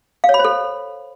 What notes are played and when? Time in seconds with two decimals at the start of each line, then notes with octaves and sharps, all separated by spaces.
0.24 F5
0.29 C#5
0.34 B5
0.39 C5
0.45 A4